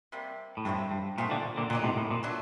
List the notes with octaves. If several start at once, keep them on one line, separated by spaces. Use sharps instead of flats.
C3 G3 A#3
A2
G2 C3 F#3 A3 C4
G2
A#2 D#3 A3 C4 F#4
A#2 D3
A#2 D3
A#2 D3 F#3 A#3 D#4
A2 C3
A2
A#2
F#3 A3 D4